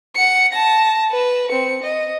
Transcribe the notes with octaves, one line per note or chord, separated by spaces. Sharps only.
F#5 C#7
A5 A#6
B4
C4 C#7
D#5